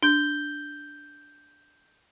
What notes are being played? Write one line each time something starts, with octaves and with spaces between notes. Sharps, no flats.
D4 G6 G7